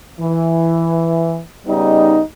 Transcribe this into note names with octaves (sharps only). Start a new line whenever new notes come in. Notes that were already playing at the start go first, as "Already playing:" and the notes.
E3
C#3 G3 B3 D#4